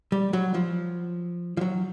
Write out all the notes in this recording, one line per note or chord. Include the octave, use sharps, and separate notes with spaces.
G3
F#3
F3
F3
F#3